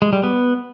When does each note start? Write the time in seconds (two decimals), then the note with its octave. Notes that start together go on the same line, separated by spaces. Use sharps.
0.02 G#3
0.13 G3
0.23 B3